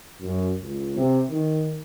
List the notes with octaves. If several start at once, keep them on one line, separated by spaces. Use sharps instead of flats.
F#2
C#2
C3
D#3